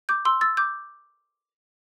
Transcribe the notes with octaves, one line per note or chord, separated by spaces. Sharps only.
D6 G6
C6 E6
E6 A6
D6 G6